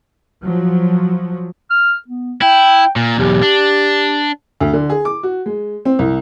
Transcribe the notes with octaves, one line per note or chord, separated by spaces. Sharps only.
F3 F#3
F6
B3
E4 G5
A#2
B1 E2 G4
D4
D2
D3
G#4
D6
F#4
G#3
C4
C2